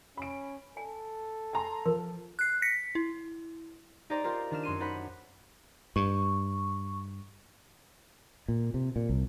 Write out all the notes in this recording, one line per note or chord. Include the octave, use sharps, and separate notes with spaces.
C#4 B5 D7
A4 G#5
G#5 A#5 C6
F3 A#4
F#6 C7
A#6 B6 C#7
E4
D#4 G4 C5 D5 A#5
F4 G4 A#4 C5
D#3 D4 F6 E7
F#2 C#4 C6 D#7
D4 D#4 C5 F#5 B5
G2 C#6
A#2
C3
A#2
C2